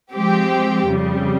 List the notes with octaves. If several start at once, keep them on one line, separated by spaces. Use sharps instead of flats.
F3 G#3 C4 G4
F2 C#3 G3